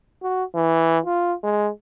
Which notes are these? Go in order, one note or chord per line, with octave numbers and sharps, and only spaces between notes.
F#4
E3
F4
G#3